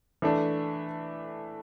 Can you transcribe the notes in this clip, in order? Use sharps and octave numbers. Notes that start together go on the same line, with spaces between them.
E3 A3 D4